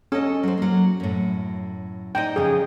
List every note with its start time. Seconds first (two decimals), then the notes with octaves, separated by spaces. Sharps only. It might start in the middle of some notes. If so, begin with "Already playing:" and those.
0.12 C#4 A4 D#5
0.43 F#3 C5
0.58 F#3 A#3
1.00 F#2 A2
2.15 D#4 D5 D#5 G5
2.36 F2 C#3 G#4